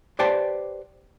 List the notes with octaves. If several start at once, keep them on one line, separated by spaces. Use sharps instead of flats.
G4 B4 C5 D5 G5 A5